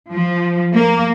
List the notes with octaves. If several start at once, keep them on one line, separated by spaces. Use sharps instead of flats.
F3
A#3